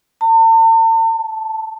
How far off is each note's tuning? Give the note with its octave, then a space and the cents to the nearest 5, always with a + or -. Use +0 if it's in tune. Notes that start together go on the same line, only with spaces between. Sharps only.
A5 +45
A5 +0